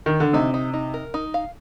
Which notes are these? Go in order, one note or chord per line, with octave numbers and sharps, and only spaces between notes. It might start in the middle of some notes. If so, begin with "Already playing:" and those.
D#3
D3
C3 D#4
D#4
D#4
A#4
D#4
F5